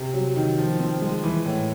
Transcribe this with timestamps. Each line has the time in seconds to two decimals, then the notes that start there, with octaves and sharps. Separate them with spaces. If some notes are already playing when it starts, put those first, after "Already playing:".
Already playing: C3
0.13 F#3
0.36 D#3
0.58 F3
0.80 C4
1.01 G#3
1.24 E3
1.46 A2